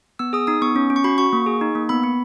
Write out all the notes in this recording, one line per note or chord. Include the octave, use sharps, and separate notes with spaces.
B3 E6
G#4 D#6
D#4 D#6
B3 C#6
C#4
C#4
C#6
F#4 B5
F#4 C#6
A#3
G#4
D#4
A#3
B3 B5
B3